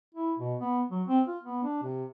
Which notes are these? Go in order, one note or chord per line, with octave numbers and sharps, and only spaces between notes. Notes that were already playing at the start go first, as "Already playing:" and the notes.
E4
B2
B3
F#3
C4
F4
B3
D4
C3